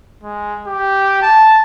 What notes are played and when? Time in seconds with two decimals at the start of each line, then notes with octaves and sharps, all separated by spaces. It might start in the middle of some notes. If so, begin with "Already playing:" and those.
0.23 G#3
0.67 G4
1.22 A5